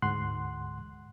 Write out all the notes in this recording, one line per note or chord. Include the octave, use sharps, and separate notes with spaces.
D2 G#2 F#5 C6 F#6